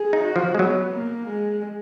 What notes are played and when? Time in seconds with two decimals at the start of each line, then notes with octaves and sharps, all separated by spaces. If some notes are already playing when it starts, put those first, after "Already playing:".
Already playing: G#4
0.13 D#4
0.24 F#4
0.36 F3
0.55 G#3
0.58 F#3 B3
0.94 A#3
1.29 G#3